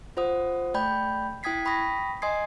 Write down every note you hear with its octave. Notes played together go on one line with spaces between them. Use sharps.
F4 C5 F#5 D#6
A3 D5 G5 B5 G6
E4 G5 D#6 G#6 B6 C7
G5 B5 C#6 D#6 A#6 B6
D#5 G#5 C6 D#6 G#6 C7